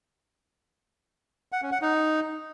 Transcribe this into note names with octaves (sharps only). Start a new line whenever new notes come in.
F#5
C#4
F#5
D#4